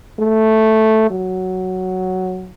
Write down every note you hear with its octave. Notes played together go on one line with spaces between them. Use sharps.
A3
F#3